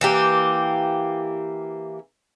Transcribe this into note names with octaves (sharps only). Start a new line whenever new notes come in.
E3 A#3 G4